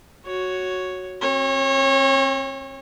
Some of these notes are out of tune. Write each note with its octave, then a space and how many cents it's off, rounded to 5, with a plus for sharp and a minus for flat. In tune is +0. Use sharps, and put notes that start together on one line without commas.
F#4 +0 C#5 +0
C4 +35 C#5 -25